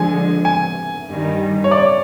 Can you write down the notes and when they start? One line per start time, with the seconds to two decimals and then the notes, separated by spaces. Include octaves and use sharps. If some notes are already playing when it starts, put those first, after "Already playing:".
Already playing: D3 F3 G#3 G#5
0.45 G#5
1.08 G2 D#3 G3
1.64 C#5
1.71 D5